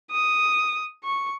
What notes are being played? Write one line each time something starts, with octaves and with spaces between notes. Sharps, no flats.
D#6
C#6